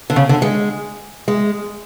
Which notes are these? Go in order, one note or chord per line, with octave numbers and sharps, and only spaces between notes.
D3
C#3
D3
G#3
G#3